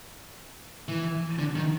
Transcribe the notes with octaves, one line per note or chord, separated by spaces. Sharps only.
E3
D3
D#3